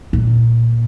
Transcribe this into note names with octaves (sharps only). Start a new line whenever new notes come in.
A#2